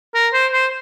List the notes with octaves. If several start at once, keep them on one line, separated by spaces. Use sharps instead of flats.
A#4
C5
C5